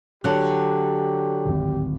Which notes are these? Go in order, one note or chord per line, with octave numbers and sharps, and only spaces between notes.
D3 F#3 G4 F#6
D1 G#1